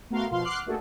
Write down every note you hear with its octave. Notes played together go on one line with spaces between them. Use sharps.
A3 B3 F#4 A#4 F5 C6
B2 F3 F5 C6
F#5 C6 D6 F6 F#6 C7
A3 A#3 D4 F#4 G#4 A4